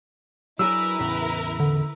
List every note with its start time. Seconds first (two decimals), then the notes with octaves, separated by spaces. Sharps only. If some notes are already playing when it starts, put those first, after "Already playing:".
0.59 F#3 D4 E4 G#4 A#4 B4 E6
1.00 E2 A2 C#3
1.60 D3